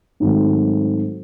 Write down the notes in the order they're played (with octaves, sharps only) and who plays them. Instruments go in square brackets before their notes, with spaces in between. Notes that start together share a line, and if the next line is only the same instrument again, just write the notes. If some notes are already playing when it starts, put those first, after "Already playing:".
[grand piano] G#2 D#3 F#3 A3 C4